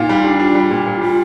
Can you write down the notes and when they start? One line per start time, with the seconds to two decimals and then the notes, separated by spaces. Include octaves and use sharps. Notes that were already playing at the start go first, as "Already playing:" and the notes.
Already playing: A#2 D#4 F4
0.09 G3
0.24 D4
0.40 D4 F4
0.55 G3
0.71 A#2
0.87 A#2
1.01 G3 F4